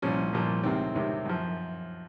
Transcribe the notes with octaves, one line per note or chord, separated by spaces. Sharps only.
C2 A#2 F3 C#4
C2 A#2 F3
C#2 C3 D#3 C4
C#2 C3 D#3
F#2 F3